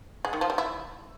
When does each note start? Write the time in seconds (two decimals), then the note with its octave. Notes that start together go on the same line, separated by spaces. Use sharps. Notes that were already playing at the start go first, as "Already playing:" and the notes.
0.25 G#3
0.33 D#3
0.41 F3
0.50 G3
0.58 E4